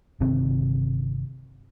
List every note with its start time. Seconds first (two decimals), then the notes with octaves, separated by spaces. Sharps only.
0.20 G1 C3 D#3 C4